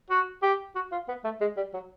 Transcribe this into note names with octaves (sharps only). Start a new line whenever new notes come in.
F#4
G4
F#4
F4
B3
A3
G#3
G3
F#3